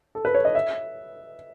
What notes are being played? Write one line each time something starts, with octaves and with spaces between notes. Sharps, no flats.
A4
B4
C#5
D#5
E5